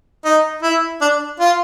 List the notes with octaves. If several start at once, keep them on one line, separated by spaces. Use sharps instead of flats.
D#4
E4
D4
F4